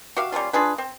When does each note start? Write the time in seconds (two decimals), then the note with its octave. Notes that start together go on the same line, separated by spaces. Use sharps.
0.17 F#4 G4 E5 F5
0.32 G3 A#3 C#4 F4
0.53 D4 F4 G#4 B4
0.78 C4